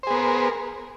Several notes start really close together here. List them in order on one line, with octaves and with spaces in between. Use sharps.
C5 G#4 B3 A#4